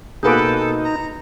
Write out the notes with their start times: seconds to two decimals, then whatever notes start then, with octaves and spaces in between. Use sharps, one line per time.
0.23 B2 A#3 D#4 F#4 G#4 A4 B4 D6
0.84 A#5